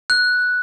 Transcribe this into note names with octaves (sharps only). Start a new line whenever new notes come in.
F#6